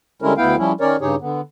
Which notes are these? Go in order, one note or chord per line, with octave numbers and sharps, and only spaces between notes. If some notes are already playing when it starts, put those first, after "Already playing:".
D3 G3 G#3 C#4 E4 A#4
D2 B3 E4 F5 G5
F3 G3 C#4 E4
D#3 C#4 A#4 C#5 D5
G2 C#3 D#4 G4 G#4 C#5
D3 B3